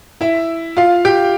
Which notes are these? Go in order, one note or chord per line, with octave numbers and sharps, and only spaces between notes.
E4 E5
F4 F5
G4 G5